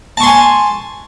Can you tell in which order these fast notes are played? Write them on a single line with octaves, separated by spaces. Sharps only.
A5 C#6 C6 G#5